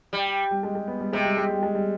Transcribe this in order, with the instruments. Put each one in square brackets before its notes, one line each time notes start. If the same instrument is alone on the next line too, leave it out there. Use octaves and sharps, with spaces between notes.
[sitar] G3
[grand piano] G3
G#3
G#3
B3
G3
[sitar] C3 [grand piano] G#3
[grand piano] G3
G#3
G3
G#3
G3